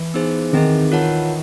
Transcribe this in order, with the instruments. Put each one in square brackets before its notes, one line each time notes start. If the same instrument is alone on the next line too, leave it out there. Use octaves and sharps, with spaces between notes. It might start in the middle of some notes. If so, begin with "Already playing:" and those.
Already playing: [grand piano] E3
[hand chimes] B3 D#4 G#4 C5
[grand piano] D#3 [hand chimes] C4 D#4 G#4
[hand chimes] F4 A#4 C#5 F#5 A5